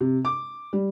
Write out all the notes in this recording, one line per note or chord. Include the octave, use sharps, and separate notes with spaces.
C3
D6
G3